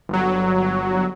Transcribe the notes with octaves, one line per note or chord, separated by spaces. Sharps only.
G1 F#3